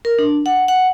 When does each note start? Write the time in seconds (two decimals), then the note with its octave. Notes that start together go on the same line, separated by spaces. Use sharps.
0.05 A#4
0.19 D4
0.46 F#5
0.68 F#5